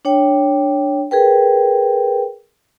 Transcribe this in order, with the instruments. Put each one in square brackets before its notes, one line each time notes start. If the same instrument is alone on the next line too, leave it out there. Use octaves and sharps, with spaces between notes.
[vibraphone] D4 C#5 G5
G#4 A#4 B4 G5